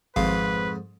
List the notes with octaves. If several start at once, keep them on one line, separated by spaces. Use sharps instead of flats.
G#1 F2 G#2 B4 F5